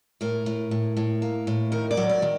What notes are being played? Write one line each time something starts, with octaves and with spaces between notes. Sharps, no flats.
A2 A#4
A2
A2
A2
A#3
A2
D#3 A#4
D5
F#3
D5
D#3